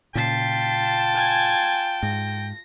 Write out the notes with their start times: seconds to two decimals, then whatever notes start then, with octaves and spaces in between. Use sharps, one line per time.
0.15 A#2 C#3 F4 G5 A5 B6 C7
1.14 G#5 G#6
2.03 G#2 A#6